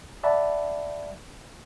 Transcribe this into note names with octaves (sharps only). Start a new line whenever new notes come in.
D5 E5 F#5 A5 B5